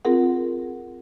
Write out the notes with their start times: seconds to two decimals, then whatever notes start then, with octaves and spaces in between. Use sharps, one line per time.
0.05 C4 F4 G#4 A#4 F#5